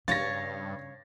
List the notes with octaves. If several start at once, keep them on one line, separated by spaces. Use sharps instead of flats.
G2 C#3 C#5 F5 A6 A#6